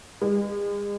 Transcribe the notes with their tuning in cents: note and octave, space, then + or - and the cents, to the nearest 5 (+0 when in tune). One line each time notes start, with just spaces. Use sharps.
G#3 -40